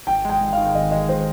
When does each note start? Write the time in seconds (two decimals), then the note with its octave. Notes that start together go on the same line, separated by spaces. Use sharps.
0.07 G#1 G5
0.25 G#3 G5
0.41 G#2
0.53 D#3 F5
0.75 G#1 D#5
0.91 G#3 D#5
1.09 C5